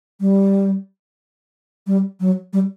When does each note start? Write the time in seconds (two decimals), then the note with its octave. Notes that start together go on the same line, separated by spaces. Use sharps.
0.20 G3
1.87 G3
2.20 F#3
2.53 G3